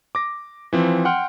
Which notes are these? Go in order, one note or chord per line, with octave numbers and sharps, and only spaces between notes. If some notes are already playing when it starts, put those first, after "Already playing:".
D6 A#6
E3 F3 C4
F#5 G5 C6 F6